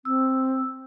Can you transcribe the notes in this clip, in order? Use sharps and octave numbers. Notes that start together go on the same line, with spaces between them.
C4 E6